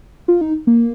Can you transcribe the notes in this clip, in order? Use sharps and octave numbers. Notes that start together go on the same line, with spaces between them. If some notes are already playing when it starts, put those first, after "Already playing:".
F4
D#4
A#3